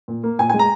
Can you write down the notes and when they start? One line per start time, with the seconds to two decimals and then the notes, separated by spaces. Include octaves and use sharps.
0.08 A#2
0.23 A#3
0.39 A#2 G#5
0.49 G#5
0.54 G#3
0.59 A#5